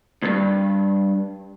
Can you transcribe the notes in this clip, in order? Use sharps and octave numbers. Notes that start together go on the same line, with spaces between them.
D2 G2